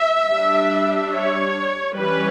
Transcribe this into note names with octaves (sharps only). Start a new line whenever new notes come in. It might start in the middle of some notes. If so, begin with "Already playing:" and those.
Already playing: E5
G3 D4
C#5
E3 G3 C#4 B4